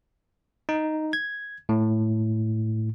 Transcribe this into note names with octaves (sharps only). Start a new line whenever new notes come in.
D#4
G#6
A2